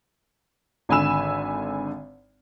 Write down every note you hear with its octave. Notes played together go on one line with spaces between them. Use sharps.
G#1 D3 G#5 B5 E6 E7